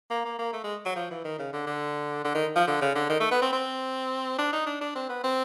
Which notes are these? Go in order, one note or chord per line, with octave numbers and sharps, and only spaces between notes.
A#3
A#3
A#3
A3
G#3
F#3
F3
E3
D#3
C#3
D3
D3
D3
D#3
F3
D3
C#3
D3
D#3
A3
B3
C4
C4
D4
D#4
D4
D4
C4
B3
C4